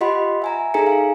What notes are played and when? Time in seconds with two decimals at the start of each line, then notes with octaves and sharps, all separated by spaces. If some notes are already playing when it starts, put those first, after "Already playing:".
0.01 F4 G4 D#5 F#5 B5 C6
0.42 E5 G#5 A#5
0.74 D#4 G#4 A4 G#5 A#5 C#7
0.87 F5